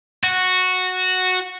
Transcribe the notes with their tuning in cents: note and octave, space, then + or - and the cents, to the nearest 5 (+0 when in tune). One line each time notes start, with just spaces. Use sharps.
F#4 -5